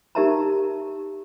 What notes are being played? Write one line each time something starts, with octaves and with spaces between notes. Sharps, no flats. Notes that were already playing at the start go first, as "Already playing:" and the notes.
D#4 G4 A#4 E5 A5 A#5